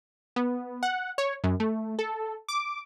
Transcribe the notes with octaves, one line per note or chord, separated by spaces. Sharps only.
B3
F#5
C#5
F#2
A3
A4
D6